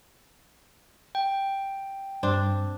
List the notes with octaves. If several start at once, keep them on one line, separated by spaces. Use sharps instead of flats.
G5
G2 C4 D4